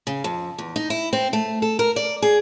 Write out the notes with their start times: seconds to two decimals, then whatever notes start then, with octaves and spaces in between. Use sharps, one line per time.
0.07 C#3
0.24 F2
0.58 E2
0.76 D#4
0.90 E4
1.13 C4
1.33 A3
1.62 A4
1.79 A#4
1.96 D5
2.22 G#4